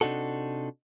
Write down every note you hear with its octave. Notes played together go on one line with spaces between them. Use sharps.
C3 D4 D#4 F#4 A4